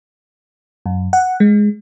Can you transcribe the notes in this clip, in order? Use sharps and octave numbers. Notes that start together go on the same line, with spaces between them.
F#2
F#5
G#3